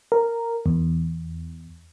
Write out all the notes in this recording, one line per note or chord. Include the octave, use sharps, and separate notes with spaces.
A#4
E2